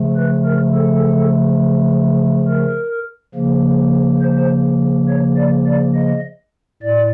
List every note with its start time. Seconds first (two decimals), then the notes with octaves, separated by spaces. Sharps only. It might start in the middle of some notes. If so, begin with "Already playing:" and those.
Already playing: C#3 F3 A3
0.16 B4
0.45 A#4
0.74 A4
2.47 A#4
3.35 C#3 F3 A#3
4.21 C5
5.08 C#5
5.37 D5
5.67 D5
5.95 D#5
6.82 A2 D5